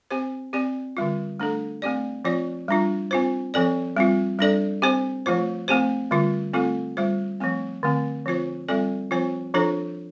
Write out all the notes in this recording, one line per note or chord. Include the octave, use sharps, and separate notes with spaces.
C4 G4 C5
C4 G4 D5
D3 G3 F4
A3 D4 A4
A3 C4 G4 D5
F3 C4 F4 D5
G3 D4 F4
C4 F4 C5
F3 C4 A4 D5
G3 C4 F4
G3 D4 A4 D5
C4 G4 C5
F3 A3 F4 C5
A3 C4 G4 C5
D3 G3 F4
A3 C4 F4 A4
G3 F4 C5
F3 A3 C4
D3 A3 C4
F3 C4 F4 C5
G3 C4 F4 A4 D5
F3 C4 F4 C5
F3 D4 F4 A4 C5